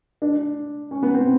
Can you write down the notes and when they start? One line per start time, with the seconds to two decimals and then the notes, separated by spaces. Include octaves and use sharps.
0.22 D4
0.91 C#4
1.03 B3
1.14 C4